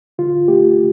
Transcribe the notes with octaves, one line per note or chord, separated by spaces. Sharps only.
D3 F4
A3 G4